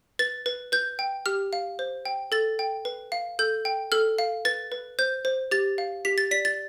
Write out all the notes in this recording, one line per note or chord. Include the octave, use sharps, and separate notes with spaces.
B4 A6
B4
B4 G6
G5
G4 F6
F5
C5
G5
A4 A6
G5
B4
F5
A4 G6
G5
A4 F6
F5
B4 A6
B4
C5 G6
C5
G4 A6
F5
G4 B6
A6
D5 B6
A6